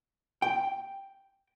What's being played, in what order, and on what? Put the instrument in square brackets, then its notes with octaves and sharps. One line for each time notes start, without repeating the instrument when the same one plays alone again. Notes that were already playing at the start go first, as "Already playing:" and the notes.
[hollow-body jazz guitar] G5